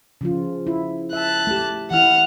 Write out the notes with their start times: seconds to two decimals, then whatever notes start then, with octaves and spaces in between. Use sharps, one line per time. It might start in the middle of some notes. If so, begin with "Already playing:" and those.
0.21 C#3 F3 F4
0.67 E4
1.13 E5 A5 F#6
1.47 A3 G4
1.91 E3 E4 F#5 F6